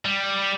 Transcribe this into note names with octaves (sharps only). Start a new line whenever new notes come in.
G3